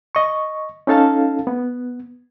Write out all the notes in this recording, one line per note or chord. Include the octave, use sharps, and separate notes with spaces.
D#5 C#6
C#4 D#4 A4 F5 A5
B3